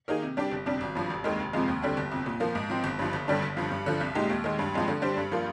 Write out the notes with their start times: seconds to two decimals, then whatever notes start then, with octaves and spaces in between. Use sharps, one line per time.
0.08 D#3 A#3 D#4 G#4
0.22 C3
0.37 G3 D4 G4 D5
0.51 G1
0.66 F2 C3 G3 D4
0.81 G#1
0.95 G2 F3
1.10 F1
1.24 D#2 D#3 G#3
1.39 F1
1.53 F2 C3 F3 G#3
1.68 D#2
1.83 D3 G3 C4
1.97 G1
2.11 F2 C3
2.26 A#2
2.40 F3 A#3
2.55 G#2
2.70 F3 C4
2.84 G1
2.99 G2 F3
3.13 G1
3.28 G2 D3 G3 D4
3.42 G1
3.57 G2 F3
3.72 G2
3.86 D3 F3
4.01 C2
4.15 A#2 G#3 D#4 G4
4.29 D#2
4.44 D#3 G#3
4.59 G2
4.74 F3 G#3 C4
4.88 D3
5.02 G3 D4 G4 C5
5.17 G2
5.32 F3 A#3 F4